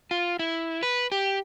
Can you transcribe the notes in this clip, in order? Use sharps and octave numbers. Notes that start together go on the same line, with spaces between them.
F4
E4
B4
G4